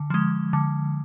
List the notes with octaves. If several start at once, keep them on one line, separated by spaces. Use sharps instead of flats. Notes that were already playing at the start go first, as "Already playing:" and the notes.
Already playing: D3
F3 G#3
D3